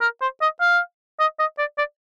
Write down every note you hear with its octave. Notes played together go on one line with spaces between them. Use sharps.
A#4
C5
D#5
F5
D#5
D#5
D5
D5